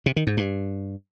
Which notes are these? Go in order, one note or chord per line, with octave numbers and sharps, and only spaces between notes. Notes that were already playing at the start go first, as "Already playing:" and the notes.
C3
D#3
G#2
G2